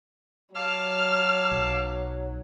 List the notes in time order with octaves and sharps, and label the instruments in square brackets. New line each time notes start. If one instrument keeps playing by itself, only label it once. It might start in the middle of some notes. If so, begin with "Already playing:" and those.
[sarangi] F#3 [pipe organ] F5 A5 D6 [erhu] F6
[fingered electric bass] B1